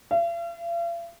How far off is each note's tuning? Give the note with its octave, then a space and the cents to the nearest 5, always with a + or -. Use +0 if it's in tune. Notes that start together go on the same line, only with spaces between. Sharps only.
F5 -45